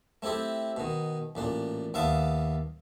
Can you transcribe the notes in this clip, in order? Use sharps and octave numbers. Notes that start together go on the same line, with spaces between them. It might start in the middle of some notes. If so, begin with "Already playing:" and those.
A3 C4 E4 G4 A4
B2 D#3
A1 A#2 D4
D#2 B3 E5 F5 A5